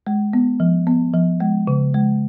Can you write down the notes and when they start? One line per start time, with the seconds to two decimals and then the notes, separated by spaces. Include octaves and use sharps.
0.07 G#3
0.33 B3
0.60 F3
0.87 B3
1.14 F3
1.40 G#3
1.67 C#3
1.94 G#3